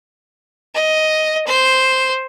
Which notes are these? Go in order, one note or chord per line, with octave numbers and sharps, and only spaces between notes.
D#5
C5